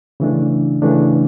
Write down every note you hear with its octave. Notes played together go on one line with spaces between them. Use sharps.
C#3 E3 A3 D4
C#3 E3 A3 D4